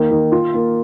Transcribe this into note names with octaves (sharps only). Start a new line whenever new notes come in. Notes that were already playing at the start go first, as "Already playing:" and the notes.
Already playing: D#3 A#3
D#3
F4
A#3